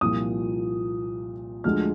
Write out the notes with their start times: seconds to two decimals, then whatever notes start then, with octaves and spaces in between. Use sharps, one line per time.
0.01 C2 A#2 F3 D#6
1.64 D2 D3 F3 G#3 F6